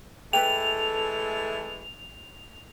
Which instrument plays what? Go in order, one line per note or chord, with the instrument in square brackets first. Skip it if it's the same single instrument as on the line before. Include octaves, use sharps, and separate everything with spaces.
[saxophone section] E3 G#3 A3 [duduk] A4 [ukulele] B4 G5 [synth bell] F7